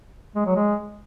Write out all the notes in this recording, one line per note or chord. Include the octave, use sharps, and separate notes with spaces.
G#3
F#3
G#3